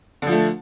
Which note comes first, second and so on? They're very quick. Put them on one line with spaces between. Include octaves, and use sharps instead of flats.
D3 F3 A3